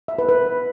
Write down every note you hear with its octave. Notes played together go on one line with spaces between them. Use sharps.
E5
B4
B4